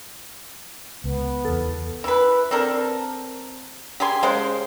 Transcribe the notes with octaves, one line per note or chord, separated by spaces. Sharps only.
C#2 B3
E2 A4
E3 B4
C4 D4 A4 A#4
G4 G#4 G#5 C6
C#3 G#3 C5